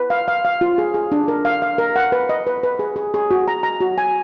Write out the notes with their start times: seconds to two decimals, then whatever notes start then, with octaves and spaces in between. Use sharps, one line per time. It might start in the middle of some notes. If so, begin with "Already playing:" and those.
Already playing: B4
0.10 F5
0.28 F5
0.45 F5
0.61 F4
0.78 G#4
0.94 G#4
1.12 D4
1.28 A#4
1.45 F5
1.62 F5
1.78 A#4
1.96 F#5
2.12 B4
2.29 D#5
2.47 B4
2.63 B4
2.79 G#4
2.96 G#4
3.14 G#4
3.31 F#4
3.48 A#5
3.63 A#5
3.81 F#4
3.98 G#5